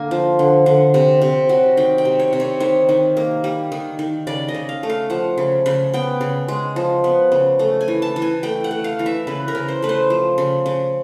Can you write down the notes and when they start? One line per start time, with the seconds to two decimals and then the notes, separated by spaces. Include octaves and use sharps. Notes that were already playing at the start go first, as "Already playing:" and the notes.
Already playing: D3 A#3 G#5
0.11 F3
0.39 D3
0.66 D3
0.94 C3
1.21 C3
1.49 F#3
1.77 D#3 G5
1.98 G5
2.05 C3
2.19 C#5
2.33 C3
2.40 C#5
2.60 D#3 C#5
2.89 D#3
3.17 A#3
3.44 G3
3.72 D#3
3.99 D#3
4.27 C#3 D5
4.48 D#5
4.55 C#3
4.69 F5
4.83 A3
4.90 F5
5.10 F3 F#5
5.38 C#3
5.66 C#3
5.94 B3 G5
6.21 C#3
6.48 G#3
6.76 F3
7.04 B3
7.32 C#3
7.59 A3
7.81 G#5
7.88 E3
8.02 A5
8.16 E3
8.22 G#5
8.43 A3 G5
8.64 F#5
8.71 A3
8.84 F5
8.99 E3
9.06 E5
9.27 C#3 B4
9.48 A#4
9.55 C#3
9.68 C5
9.82 A3 B4
9.89 C5
10.10 F3
10.38 C#3
10.66 C#3